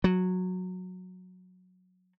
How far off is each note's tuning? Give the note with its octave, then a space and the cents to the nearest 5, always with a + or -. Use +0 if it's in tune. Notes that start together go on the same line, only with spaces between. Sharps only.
F#3 -15